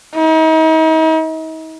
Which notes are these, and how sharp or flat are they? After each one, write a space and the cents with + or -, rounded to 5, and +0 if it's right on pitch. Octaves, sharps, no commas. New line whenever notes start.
D#4 +40